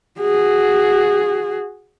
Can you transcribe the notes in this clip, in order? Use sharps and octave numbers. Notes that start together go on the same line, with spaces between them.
F#4 G#4